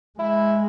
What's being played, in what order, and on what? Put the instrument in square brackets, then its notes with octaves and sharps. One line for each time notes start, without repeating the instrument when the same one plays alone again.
[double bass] G#3 [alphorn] E4